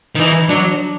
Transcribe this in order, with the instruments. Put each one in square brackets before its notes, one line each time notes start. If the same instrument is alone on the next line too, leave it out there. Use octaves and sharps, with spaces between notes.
[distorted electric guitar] D#3
[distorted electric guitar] E3 [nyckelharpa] D#4
[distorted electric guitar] F#3 [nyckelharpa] D4